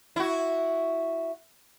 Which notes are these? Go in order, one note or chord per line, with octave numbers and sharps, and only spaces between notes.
E4 F#4